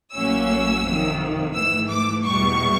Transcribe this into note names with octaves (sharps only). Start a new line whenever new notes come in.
A1 A2 F#3 A#3 C#4 E6
F2 C3 D#3
G#2 E3 A3 E6
D6
E2 B2 G3 C#6